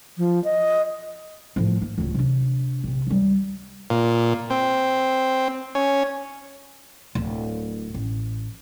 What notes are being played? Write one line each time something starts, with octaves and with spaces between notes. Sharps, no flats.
F3
D#5
A2 F3
A#3
D1 C#2
C3 D4
A#1 C3
C#2 G3
A#2
C4
C#4
D1
A1